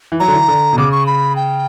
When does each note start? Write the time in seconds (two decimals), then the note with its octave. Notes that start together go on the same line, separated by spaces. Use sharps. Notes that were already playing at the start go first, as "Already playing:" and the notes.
0.12 E3
0.20 F#3 A#5
0.28 D3
0.34 E3
0.48 D3
0.73 B2
0.78 C#3 D6
0.92 C#6
1.06 B5
1.36 G5